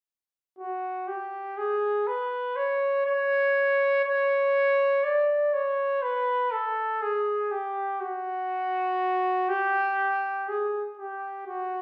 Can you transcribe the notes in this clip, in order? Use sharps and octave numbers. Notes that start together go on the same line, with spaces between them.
F#4
G4
G#4
B4
C#5
C#5
C#5
D5
C#5
B4
A4
G#4
G4
F#4
G4
G#4
G4
F#4